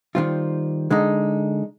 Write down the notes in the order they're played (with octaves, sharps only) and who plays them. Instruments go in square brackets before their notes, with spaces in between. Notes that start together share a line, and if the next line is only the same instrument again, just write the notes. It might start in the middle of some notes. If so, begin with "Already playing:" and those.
[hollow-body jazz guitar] D#3 G3 C4 F4
D3 G#3 D#4